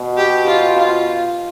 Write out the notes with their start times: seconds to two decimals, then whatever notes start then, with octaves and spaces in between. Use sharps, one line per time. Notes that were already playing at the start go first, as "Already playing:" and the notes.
Already playing: B2
0.17 G4
0.47 F4
0.78 F4